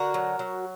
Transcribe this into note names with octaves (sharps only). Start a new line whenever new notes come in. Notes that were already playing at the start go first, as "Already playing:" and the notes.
Already playing: D3 F#4 A#4
F#3
F#3